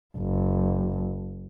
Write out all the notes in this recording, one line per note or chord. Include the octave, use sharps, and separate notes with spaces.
F#1